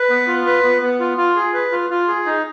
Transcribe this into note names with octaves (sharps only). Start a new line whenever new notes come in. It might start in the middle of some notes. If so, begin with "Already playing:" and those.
Already playing: B4
B3
F4
B4
B3
B3
F4
F4
G#4
B4
F4
F4
G#4
D#4